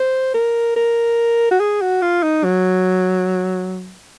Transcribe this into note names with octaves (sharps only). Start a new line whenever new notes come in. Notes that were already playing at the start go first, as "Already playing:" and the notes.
Already playing: C5
A#4
A#4
F#4
G#4
F#4
F4
D#4
F#3